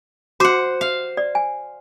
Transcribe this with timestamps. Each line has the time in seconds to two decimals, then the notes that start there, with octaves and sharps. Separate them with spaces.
0.40 F#4 C5 F#5 D6
0.81 F5
1.17 D5
1.35 G#5